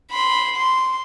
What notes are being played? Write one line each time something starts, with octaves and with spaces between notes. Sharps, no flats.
B5 C6
C6